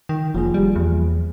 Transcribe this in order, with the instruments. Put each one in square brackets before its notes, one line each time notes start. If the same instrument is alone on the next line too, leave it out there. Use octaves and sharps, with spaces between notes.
[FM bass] D#3 [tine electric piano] G5
[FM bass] F1 [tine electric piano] F3 A#3 G#4
[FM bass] G3
E2